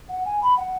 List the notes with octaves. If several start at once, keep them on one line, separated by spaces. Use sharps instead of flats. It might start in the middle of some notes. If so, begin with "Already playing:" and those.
F#5
G#5
B5
F#5